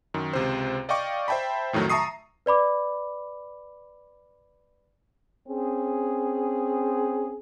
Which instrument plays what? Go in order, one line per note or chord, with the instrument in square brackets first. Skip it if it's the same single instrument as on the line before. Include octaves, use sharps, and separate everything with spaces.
[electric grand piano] F#2 D#3
C#2 C3 C5
D5 D#5 F5 G5 C#6 D6
C5 E5 G5 A5 B5
F2 A2 D#3 F#3 A3
E5 A5 A#5 C#6 D#6 C7
[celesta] B4 D5 B5 D6
[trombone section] C4 C#4 G#4